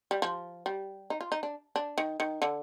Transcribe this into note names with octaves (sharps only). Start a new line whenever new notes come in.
G3
F3
G3
D#4
F4
D#4
D4
D4
D#3
D#3
D3